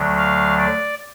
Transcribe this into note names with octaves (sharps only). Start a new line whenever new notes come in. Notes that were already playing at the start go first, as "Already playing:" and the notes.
Already playing: D2 D3 F#3
F5
D5